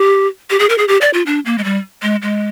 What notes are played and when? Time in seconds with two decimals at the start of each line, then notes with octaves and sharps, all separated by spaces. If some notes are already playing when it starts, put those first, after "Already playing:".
Already playing: G4
0.50 G4
0.60 G#4
0.69 A#4
0.78 G#4
0.88 G4
1.01 D5
1.14 F4
1.26 D4
1.46 A#3
1.58 G#3
1.64 G3
2.02 G#3
2.22 G#3